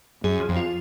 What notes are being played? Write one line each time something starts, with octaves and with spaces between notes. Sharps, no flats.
F#2 G#4
F3
F2
F4